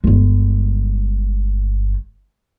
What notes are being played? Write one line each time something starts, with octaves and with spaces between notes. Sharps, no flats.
G1 G#3